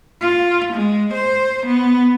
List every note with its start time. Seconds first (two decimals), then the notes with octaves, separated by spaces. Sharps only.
0.21 F4
0.73 G#3
1.14 C5
1.67 B3